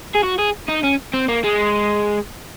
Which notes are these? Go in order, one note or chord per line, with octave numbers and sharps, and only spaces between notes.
G#4
F#4
G#4
D#4
C#4
C4
A#3
G#3